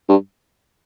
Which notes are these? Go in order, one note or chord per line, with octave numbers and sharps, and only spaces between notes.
G2